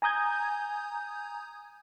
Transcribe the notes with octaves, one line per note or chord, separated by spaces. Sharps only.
G#5 A#5 D#6 G6 G#6